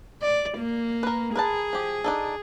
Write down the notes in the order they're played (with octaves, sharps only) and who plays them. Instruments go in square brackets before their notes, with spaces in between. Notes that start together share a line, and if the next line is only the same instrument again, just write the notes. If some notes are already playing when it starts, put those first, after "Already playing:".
[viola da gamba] D5
A#3
[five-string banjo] A#4 B4
[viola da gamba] G#4 [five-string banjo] A#4 B4 A5
[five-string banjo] F3 G4
D4 D#4 A4